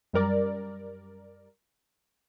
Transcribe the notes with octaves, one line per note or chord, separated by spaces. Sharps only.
F#2 G3 A#4 D5